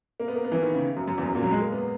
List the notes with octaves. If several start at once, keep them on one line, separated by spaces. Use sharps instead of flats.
A#3
B3
A#3
B3
E3
D#3
C#3
F#2
F#2
E2
F#2
A#2
F#3
G#3
A#3
B3